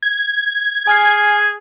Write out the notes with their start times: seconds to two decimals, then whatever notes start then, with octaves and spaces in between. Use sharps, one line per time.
0.02 G#6
0.87 G#4 G#5 F6 C7